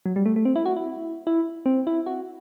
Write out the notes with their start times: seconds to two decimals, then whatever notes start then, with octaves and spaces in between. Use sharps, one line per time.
0.06 F#3
0.16 G3
0.26 A3
0.36 A3
0.45 C4
0.56 E4
0.66 F#4
0.77 E4
1.27 E4
1.66 C4
1.87 E4
2.06 F#4